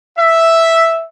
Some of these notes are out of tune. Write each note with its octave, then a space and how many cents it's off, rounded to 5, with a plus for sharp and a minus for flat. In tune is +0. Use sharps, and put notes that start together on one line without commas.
E5 +0